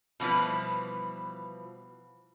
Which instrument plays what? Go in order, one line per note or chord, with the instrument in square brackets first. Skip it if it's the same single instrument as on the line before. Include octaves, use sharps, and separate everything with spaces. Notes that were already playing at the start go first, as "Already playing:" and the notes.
[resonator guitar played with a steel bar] B2 E3 F3 G3 B4